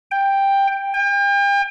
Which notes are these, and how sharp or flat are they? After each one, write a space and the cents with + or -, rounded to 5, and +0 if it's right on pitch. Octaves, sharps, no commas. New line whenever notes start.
G5 +10
G5 +40